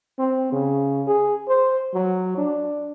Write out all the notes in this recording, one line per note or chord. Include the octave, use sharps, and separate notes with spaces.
C4
C#3
G#4
C5
F#3
D4